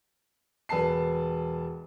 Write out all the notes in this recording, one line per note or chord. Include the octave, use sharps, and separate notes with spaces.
E1 B4 G#5 A5 C7